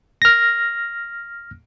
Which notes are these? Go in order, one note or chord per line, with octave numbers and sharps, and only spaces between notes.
F6 A#6